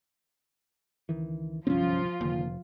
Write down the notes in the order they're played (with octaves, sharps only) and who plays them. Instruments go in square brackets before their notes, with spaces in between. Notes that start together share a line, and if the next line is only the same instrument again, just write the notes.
[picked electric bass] C#2 D#3 E3
[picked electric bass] G1 C2 F#2 [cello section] F3 F4 [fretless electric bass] C4 C#4
[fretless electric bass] F1 [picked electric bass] D3 D#3 A#3